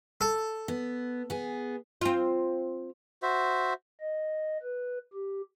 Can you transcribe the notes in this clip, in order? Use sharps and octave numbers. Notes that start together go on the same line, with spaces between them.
A4
B3
B3 G#4
C4 F4
F#4 C5 E5
D#5
B4
G4